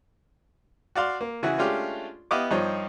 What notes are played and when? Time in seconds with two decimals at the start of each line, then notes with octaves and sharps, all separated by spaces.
0.95 F#4 D5 F5 C6
1.21 A#3
1.43 C#3 E3 E4 F#4 G#4
1.58 G#3 A3 C#4 D4 F4 G4
2.31 B3 E4 G4 D#5 F5 D6
2.51 G2 F3 D#4 C#5